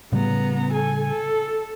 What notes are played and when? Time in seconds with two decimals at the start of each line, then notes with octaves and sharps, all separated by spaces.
0.12 A2 C#3 G3 B3 A#5
0.73 A4 G#5
1.08 A4